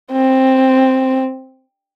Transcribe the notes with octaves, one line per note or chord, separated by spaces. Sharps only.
C4